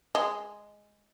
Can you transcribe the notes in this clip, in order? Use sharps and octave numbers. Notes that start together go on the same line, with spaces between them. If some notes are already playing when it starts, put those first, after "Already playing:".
G#3